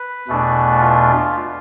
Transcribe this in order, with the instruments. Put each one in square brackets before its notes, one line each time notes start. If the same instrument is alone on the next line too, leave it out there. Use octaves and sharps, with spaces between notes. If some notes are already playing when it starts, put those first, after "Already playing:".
Already playing: [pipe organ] B4
E2 B2 A3 D4
F4